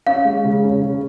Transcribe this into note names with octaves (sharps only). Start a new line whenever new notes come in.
C#4 F5
G#3
C#3
C#4
C#3